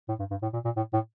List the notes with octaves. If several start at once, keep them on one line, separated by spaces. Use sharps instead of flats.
A2
G2
G2
A2
A#2
A#2
A2
A2